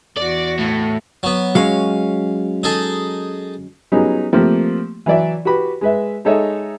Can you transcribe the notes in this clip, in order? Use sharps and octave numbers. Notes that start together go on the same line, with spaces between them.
E2 F#4 D5
A2
F#3 B3
F#3 G#3 C#4 F5
D#4 G#4 A4
F#3 G3 B3 C#4 D#4 G#4
F3 A3 A#3 C4 G4
E3 F#3 D5 E5
F#4 G4 B4 B5
G#3 B4 E5
G#3 D#4 A4 C#5 D#5 E5